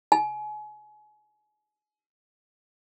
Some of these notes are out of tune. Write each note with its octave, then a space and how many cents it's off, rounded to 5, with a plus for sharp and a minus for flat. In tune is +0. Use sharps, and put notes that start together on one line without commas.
G#5 +30